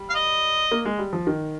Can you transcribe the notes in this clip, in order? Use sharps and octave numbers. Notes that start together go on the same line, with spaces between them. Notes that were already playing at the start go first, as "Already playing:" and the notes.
Already playing: G3
F5
D#5
A#3
G#3
G3
F3
D#3